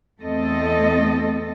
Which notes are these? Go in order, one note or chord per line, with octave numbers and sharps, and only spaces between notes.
E2 A3 C4 A4 D#5